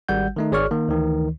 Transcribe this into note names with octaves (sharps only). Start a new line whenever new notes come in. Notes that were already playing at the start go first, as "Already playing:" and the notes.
G#1 G3 F#5 G6
D#3 A3 D#4
G#1 G#4 C#5 D5 C#6 F6
D#3 A#3
D2 D#3 E3